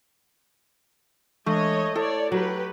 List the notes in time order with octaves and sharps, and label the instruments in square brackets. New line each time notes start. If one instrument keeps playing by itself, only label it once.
[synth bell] E3 G#3 D4 [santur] A3 [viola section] C#5 D#5
[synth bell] E4 [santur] A4 [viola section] C#5 D5
[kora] F#3 [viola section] G4 B4